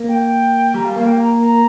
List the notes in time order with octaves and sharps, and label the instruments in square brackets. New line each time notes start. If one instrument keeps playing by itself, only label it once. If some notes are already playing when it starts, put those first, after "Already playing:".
Already playing: [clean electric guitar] A#3
[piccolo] G5
[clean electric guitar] G3 [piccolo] A#5
[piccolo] F5
[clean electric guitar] A#3 [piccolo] F5
[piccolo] G5
A#5
A#5